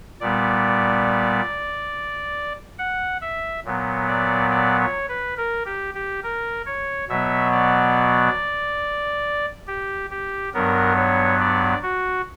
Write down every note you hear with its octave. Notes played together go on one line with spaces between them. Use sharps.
A#2 G3 B3 D5
F#5
E5
A#2 F#3 B3
D5
D5
C#5
B4
A#4
G4
G4
A#4
C#5
B2 F#3 B3 E5
D5
G4
G4
G2 F#3 B3 A#4
C#5
D5
F#4